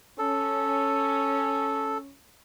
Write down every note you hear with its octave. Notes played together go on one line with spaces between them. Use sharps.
C#4 A4